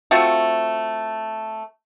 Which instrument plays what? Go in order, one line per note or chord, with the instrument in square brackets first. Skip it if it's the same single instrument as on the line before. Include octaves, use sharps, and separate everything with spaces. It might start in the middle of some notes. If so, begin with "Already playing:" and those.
[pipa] A3 C4 F4 F#4